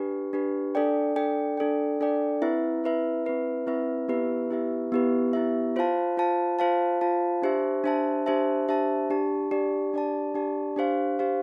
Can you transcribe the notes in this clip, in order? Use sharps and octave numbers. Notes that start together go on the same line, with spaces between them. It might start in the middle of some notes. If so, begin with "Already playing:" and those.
Already playing: D4 G4 B4
D4 G4 B4
D4 A4 D5 G5
D4 A4 D5 G5
D4 A4 D5 G5
D4 A4 D5 G5
C4 E4 B4 E5
C4 E4 B4 E5
C4 E4 B4 E5
C4 E4 B4 E5
B3 E4 G4 B4 E5
B3 E4 G4 B4 E5
B3 E4 G4 B4 E5
B3 E4 G4 B4 E5
F4 C5 F5 A5
F4 C5 F5 A5
F4 C5 F5 A5
F4 C5 F5 A5
D4 G4 C5 E5 A5
D4 G4 C5 E5 A5
D4 G4 C5 E5 A5
D4 G4 C5 E5 A5
D4 G4 D5 A5
D4 G4 D5 A5
D4 G4 D5 A5
D4 G4 D5 A5
D4 G4 C5 F5
D4 G4 C5 F5